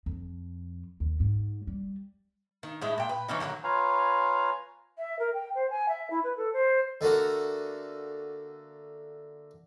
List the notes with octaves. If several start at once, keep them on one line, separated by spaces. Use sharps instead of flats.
F2
D#2
G#2
G3
D#3
A2 G#3 E4
A#2 G5
B4
E3 F3 C#4 D#4
D3 D#3 F#3 A#3
F4 B4 C#5 F5 G#5 A#5
E5
A#4
G5
C5
G#5
E5
E4
B4
A4
C5
D3 A3 A#3 F#4